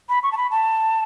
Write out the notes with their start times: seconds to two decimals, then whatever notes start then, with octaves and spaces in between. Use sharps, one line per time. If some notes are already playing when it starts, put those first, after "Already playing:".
0.09 B5
0.23 C#6
0.32 A5
0.37 B5
0.51 A5